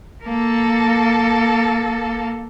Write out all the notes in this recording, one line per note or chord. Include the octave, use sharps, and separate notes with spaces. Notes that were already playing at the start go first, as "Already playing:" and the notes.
A#3 A4